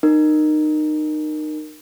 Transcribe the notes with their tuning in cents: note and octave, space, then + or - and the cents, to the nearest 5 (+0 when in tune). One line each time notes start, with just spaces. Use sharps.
D#4 -30 A#4 +0